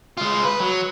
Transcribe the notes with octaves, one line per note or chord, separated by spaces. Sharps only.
G#3 F4
B4
F#3